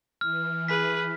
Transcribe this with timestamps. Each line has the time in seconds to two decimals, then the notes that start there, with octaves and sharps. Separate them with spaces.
0.21 E3 F6
0.68 G#4 B4 B6